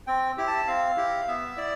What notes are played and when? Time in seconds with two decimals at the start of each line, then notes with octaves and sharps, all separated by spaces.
0.07 C4 G5
0.37 E4 G4
0.47 A5
0.67 C4 F5
0.97 E4 G4
1.28 B3 E5
1.57 E4 D5